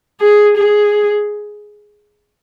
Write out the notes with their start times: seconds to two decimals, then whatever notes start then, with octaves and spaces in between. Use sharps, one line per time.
0.21 G#4
0.57 G#4